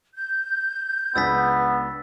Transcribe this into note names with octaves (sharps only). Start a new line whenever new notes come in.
G6
C#2 B3 D4 G#5 E6 A6 B6